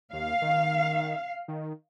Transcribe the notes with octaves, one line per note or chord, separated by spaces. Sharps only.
D#2 F5
D#3
D#3